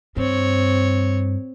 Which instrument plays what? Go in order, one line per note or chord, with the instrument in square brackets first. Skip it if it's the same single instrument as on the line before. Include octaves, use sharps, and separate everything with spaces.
[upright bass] G2 [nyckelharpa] C4 C#5